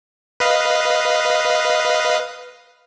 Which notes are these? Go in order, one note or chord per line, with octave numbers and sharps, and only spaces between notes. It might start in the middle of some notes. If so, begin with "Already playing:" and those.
B4 D#5 F5